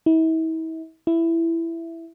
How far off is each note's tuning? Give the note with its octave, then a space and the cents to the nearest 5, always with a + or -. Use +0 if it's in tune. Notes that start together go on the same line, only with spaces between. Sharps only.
E4 -40
E4 +10